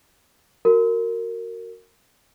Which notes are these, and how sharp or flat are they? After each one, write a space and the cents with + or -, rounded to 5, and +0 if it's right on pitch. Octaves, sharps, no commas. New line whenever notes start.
F#4 +0 A#4 -20